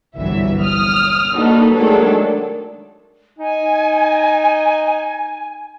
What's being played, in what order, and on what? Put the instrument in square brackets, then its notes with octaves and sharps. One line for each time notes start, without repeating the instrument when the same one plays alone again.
[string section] G1 C2 E3 F#3 E5
D#6 F6
A#3 D4 D#4 F#4 A4 B4
D#3 F#3 G#3 A3 D4 A4
[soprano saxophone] D#4 [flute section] G#5